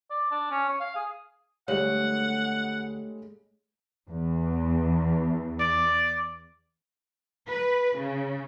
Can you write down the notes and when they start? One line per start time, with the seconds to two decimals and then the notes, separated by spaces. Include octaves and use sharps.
0.10 D5
0.31 D4
0.51 C#4
0.68 C#5
0.80 F5
0.96 G#4
1.68 D2 G3 G#3 C#5 F5 F#5 F#7
4.09 E2
5.60 D5
7.48 B4
7.97 C#3